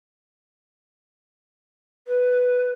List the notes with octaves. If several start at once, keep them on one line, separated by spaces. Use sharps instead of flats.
B4